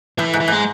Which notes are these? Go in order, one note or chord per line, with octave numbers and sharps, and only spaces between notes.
A2 E3
G#2
E3
G#2 G#3